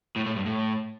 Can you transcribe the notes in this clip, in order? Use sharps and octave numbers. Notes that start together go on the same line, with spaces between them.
A2
A2
G2
A2